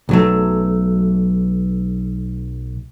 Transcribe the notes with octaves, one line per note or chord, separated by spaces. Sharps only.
B1 F#3 A3